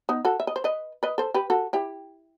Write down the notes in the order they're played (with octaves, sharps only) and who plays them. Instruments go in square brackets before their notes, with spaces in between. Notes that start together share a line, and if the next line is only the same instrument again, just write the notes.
[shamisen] B3 D#4
F#4 A4
E5
D#5
C5
B4 D#5
B4 D#5
A4 C5
G4 B4
F#4 A4
E4 G4